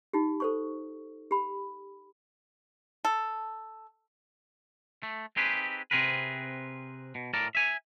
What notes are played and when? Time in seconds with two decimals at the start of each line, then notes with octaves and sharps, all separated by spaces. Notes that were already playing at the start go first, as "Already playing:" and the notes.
0.13 D#4 F4 G4
0.40 A4 C5 C#6
1.31 G4 B5
3.05 A4
5.03 A3
5.37 C4 D#4 G4 G#4 B4
5.91 C3 C4 G#4 A#4 B4
7.15 B2
7.33 A2 A#4 D5 A5
7.55 E5 G#5